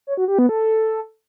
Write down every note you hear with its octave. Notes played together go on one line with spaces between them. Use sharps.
C#5
F#4
G4
B3
A4